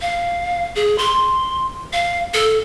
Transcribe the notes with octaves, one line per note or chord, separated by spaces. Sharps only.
F5
G#4
C6
F5
A4